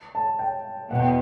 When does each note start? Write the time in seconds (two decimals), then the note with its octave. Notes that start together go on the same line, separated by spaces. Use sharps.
0.15 A5
0.39 G5
0.91 E2 B2 F#5
0.99 G5